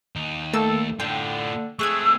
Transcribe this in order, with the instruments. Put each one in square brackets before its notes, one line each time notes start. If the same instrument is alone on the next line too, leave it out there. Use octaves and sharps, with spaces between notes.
[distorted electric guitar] D#2 D#4
[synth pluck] A3 A#3 E6 [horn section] A4
[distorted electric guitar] A2 F4 [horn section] D3 [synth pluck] G5
[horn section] G#3 G#4 [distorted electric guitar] A3 C4 [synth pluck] C#6 F#6 G#6 [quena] E6